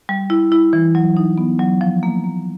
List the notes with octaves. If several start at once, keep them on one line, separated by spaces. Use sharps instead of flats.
G3
E4
E4
E3
F#3
D#4
B3
F#3
F3
A#3
A#3